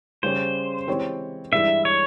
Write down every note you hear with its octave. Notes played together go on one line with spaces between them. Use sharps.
C#3 G3 C#4 G4 C5 C#5
E3 G#3 C4 G4 C#5
G2 E3 G#3 E4 E5
C#5